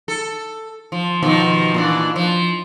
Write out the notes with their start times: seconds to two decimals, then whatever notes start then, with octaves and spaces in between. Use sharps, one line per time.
0.08 A4
0.92 F3
1.22 B2 D#3 F3
1.74 A#2 E3 D4
2.16 F3